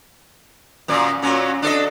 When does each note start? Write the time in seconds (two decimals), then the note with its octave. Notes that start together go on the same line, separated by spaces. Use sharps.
0.88 F#2 A#2 D5
1.22 A#2 F#3 C#4
1.62 D4 A4 D#5